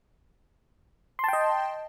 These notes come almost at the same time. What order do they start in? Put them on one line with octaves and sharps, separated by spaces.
C6 A5 G5 D#5